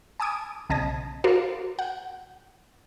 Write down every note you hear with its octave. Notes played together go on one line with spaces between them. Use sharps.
G#5 A5 D6 D#6 G#6
B1 C#3 D#5 A5 G#6 A#6
F#4 A#4 C5 D5 F5
F#5 G5